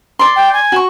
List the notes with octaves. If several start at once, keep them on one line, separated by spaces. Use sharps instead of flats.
D5 C6
G5
G#5
F#4 C#6